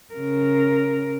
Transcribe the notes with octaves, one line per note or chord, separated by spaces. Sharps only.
C#3 A#4